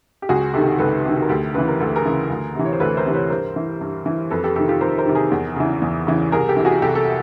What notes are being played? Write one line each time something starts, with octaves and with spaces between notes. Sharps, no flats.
G4
C#2 F#4 G#4
C3 D#3 G4 A4
C#2 A4 B4
C3 D#3
A#4
D2 G4 A4
C#3 E3 B4
A#4
D2 A4
G#4 A#4
C#3 E3
D2
C3 E3
C#5
C5
D2 A4 B4
A#4 C5
C3 E3
B4 C#5
G2 A#4 C5
E3
G2
E3
F2 A4 B4
G4 A4
C3 D#3 G4 A4
F4 G4
F2 A#4 C5
A#4 C5
C3 D#3
G#4 A#4
E2
C#3 E3
E2
C#3 E3
C2 G#4 A#4
G4 A4
C3 E3
F#4 G#4
C2 G4 A4
A4